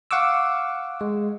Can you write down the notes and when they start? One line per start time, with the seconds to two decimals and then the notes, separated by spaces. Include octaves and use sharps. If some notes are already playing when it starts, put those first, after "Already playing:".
0.11 F5 F#5 C#6 D6 E6
1.01 G#3